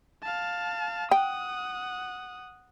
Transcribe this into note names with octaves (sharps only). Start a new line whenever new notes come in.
F5 A5
F#5 G5 D#6